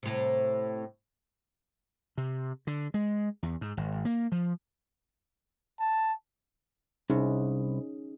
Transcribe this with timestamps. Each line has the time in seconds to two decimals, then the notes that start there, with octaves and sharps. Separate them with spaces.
0.03 A2 C3
2.18 C3
2.67 D3
2.94 G#3
3.43 E2
3.61 G#2
3.77 G#1
4.05 A#3
4.32 F3
5.80 A5
7.10 C2 C#4 D#4 G#4